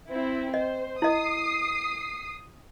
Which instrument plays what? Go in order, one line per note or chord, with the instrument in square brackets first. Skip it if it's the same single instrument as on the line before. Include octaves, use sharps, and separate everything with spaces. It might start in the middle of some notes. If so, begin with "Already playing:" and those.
[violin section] C4 E4
[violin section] C5 [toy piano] D#5
[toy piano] E4 D#5 [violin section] D#6 C7